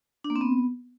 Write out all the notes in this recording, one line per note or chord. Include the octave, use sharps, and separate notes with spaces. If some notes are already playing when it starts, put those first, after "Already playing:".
D4
A#3
C4
B3